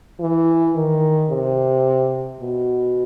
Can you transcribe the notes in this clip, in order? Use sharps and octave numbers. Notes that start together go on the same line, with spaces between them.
E3
D#3
C3
B2